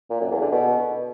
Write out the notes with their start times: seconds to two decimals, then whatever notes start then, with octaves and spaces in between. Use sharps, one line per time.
0.10 A#2
0.20 F#2
0.31 E2
0.41 D3
0.52 B2